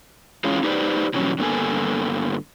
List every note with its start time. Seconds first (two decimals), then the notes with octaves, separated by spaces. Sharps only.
0.44 E3 G#3 C#4 F4
0.63 D#4 G4 B4 C5 D5
1.14 B2 E3 F#3 G3 C#4
1.38 G2 D3 A#3 B3 A4 G#5